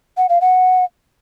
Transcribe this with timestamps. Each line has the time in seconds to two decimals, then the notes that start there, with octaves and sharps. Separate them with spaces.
0.17 F#5
0.29 F5
0.41 F#5